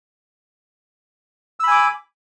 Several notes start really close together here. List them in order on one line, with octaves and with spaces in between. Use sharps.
E6 B5 G#5 D6